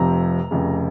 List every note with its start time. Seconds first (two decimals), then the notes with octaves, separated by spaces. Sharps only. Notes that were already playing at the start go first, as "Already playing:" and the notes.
Already playing: F1 F2 C3 F3 A#5
0.51 F1 F2 C#3